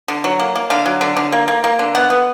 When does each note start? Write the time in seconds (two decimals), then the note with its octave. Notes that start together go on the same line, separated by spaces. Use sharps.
0.08 D3
0.24 F#3
0.39 A#3
0.55 A#3
0.70 D3 F5
0.86 F#3
1.01 D3
1.17 D3
1.32 A#3
1.48 A#3
1.64 A#3
1.79 D3
1.95 B3 F#5
2.10 B3